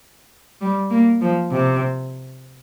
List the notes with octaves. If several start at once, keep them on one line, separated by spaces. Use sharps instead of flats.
G3
A#3
F3
C3